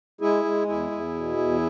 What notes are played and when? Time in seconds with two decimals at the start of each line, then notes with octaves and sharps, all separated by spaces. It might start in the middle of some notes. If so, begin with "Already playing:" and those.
0.21 G#3 E4 G#4
0.44 G#3
0.67 E2 E4 G#4
0.91 E2
1.15 B2
1.37 E2